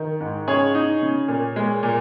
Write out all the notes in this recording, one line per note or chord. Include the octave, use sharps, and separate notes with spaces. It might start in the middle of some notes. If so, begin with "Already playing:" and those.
Already playing: D#3
G#2
C#3 G#4 C#5
D#4
C#3
A#2
G#3
A#2